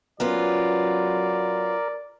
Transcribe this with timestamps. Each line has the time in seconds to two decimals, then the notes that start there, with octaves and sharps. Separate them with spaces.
0.20 F#3 B3 C#4 F4 A#4 D5